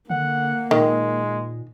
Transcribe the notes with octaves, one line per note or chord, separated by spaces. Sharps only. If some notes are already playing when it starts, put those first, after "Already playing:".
D3 A#3 F#5
A#2 D#3 G#3